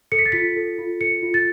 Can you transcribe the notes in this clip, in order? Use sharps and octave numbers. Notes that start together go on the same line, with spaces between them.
A4 C#7
B6
A6
F4 B6
A4
F4
A4 C#7
F4
A6